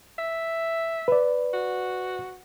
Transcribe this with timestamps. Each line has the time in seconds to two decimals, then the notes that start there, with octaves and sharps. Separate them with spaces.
0.18 E5
1.08 B4 D5
1.53 F#4